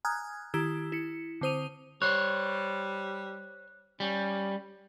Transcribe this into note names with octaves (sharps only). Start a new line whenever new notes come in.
G#5 A#5 D#6 F6 F#6 G#6
D#3 E4 G4 E6 G#6
E4 C#7
D3 C4 C5 D#6 D#7 F7
G3 C5 C#5 F#6
G3 C#4